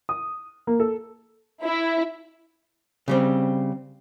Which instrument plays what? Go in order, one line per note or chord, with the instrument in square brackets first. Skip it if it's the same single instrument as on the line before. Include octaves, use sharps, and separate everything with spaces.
[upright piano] D#6
A#3
A4
[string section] E4
[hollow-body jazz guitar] C#3 G3 C4